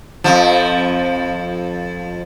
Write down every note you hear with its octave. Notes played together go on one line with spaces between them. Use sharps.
F2 G#2 F3